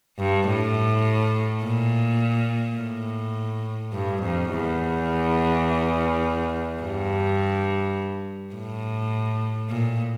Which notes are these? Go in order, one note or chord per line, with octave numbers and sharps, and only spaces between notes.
G2
A2
A#2
A2
G2
F2
E2
G2
A2
A#2